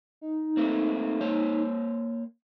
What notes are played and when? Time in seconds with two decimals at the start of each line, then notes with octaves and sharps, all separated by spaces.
0.21 D#4
0.57 A3 A#3 C4
1.21 A#3 C5 C#5